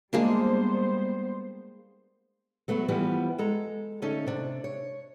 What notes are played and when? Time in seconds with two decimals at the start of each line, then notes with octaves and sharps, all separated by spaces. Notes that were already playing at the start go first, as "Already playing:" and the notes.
0.13 G3 G#3 A#3 B3 D4 C5
2.68 F#3 A3 B3 E4 F#4
2.88 E3 F3 G3 B3
3.38 G#3 A4 A#5
4.02 D3 A3 C#4 D#4 A4
4.27 C3 D4
4.64 C#5